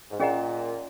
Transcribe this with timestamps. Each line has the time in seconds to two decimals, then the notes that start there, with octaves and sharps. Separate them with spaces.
0.11 G#2
0.19 A#2 C#4 G#4 D#5 F#5 A#5